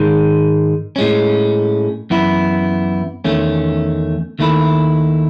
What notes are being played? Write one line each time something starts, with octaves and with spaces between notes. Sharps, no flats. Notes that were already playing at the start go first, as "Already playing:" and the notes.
Already playing: G#2 D#3 G#3
A2 G#3 C#4
F#2 E3 B3 E4
E2 D#3 A3 C#4
D#2 D#3 A3 E4